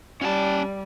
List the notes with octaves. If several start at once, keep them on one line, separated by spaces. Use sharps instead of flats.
G3 C#4 A5